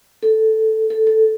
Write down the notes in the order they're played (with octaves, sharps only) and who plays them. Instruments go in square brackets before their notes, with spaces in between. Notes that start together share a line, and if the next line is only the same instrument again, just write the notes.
[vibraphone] A4
A4
A4